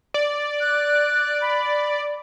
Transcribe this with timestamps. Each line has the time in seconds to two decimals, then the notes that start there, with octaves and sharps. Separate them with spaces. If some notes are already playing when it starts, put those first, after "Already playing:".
0.14 D5
0.61 F#6
1.41 B5